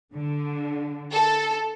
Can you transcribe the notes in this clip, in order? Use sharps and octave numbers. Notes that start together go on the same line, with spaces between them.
D3
A4